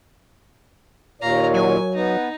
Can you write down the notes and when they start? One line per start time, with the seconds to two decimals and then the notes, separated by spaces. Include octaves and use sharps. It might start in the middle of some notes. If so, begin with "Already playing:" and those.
1.21 D#2 A#2 A#4 C#5 F5 A#5
1.54 F#3 G#5
1.95 B3 D#4